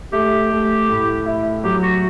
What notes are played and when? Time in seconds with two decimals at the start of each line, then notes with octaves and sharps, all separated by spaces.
0.13 A3 G4
0.50 A3
0.89 A2
1.26 E4
1.64 F#3 G4
1.83 F#4